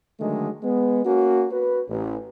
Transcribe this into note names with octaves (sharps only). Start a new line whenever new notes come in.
D3 D#3 F#3 G#3 A3
G#3 B3
A#3 C#4 F#4
F#4 B4
A1